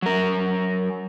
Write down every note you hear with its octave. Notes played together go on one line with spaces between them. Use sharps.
F#3 A#4